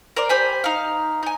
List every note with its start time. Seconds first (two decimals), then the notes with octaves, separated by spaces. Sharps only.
0.17 A#4 C5 D5
0.29 G4 C5 G#5 B5
0.64 D#4 F5
1.23 D#4 G#5